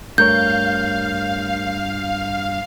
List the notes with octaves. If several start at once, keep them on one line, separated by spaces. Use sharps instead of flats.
G2 A3 A#4 C#5 F5 G6